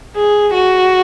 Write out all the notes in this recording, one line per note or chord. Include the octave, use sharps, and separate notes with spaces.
G#4
F#4